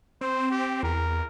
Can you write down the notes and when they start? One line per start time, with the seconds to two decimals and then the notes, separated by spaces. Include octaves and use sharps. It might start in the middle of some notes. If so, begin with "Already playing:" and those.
0.21 C4 C5
0.51 G4
0.83 E2 A#4